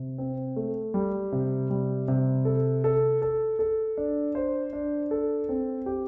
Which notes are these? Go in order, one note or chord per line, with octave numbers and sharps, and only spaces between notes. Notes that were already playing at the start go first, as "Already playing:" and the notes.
Already playing: C3
C4
A3
G3
C3
G3
C3
A4
A4
A4
A4
D4
C5
D4
A4
C4
G4